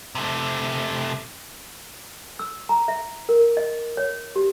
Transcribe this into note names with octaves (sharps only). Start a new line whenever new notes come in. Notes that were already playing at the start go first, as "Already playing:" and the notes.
C3 A3
E6
A#5
E5
A#4
D#5
C#5
G4